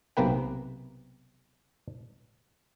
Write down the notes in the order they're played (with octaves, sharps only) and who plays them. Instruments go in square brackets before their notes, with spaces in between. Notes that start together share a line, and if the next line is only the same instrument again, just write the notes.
[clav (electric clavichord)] B1 C3 A#3 B4 G5